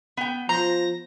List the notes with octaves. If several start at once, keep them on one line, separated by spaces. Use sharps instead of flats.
B3 G5
F3 C5 A#5 A#6